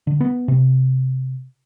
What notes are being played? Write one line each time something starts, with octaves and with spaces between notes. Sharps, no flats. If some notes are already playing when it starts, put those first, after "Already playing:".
D3
B3
C3